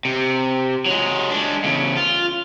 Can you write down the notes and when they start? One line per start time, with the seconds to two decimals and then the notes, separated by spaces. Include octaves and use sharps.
0.05 C3
0.86 F#3 G#3
1.31 G#3 D4
1.64 E2 C#3
1.97 F4